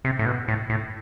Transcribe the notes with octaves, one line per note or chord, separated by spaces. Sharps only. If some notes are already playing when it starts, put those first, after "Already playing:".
C3
A2
B2
A2
A2